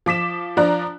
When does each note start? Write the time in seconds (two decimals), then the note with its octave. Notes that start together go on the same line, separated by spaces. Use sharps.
0.06 F3 D6 B6 E7
0.57 F3 D4 D5 A#5 F#6